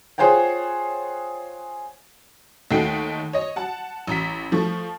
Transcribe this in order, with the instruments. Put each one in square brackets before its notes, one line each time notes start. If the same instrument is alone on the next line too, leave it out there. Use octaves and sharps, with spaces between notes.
[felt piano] F4 G#4 C5 C#5 F#5 G5
[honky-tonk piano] D#2 A3 D#4 F#5 G5 C7
C#5 D#5
F#5 A5
A1 A#5 B6
F3 A3 C#6